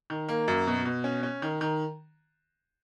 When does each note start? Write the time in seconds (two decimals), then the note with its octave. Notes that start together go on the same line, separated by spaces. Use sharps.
0.10 D#3
0.29 A#3
0.48 F#2
0.67 B2
0.85 B2
1.04 C#4
1.23 C#4
1.42 D#3
1.61 D#3